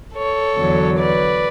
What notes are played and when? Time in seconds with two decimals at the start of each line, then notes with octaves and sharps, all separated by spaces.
0.16 A4 C#5
0.57 E2 D3 F#3
0.97 B4 D5